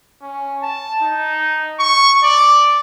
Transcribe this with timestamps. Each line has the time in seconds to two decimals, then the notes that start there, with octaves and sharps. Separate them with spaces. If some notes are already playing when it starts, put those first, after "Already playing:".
0.22 C#4
0.62 A5
1.02 D#4
1.80 C#6
2.23 D5